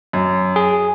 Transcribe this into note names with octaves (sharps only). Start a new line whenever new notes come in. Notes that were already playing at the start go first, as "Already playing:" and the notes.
F#2
G#4